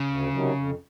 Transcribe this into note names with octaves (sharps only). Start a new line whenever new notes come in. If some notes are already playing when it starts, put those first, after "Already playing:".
Already playing: C#3
D2
C3 D#3 F#3
F2